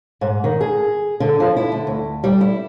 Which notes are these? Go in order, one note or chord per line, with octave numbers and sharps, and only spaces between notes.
G#2
D#3
G#4
D3
F3
E4
D3
D2
G3
E4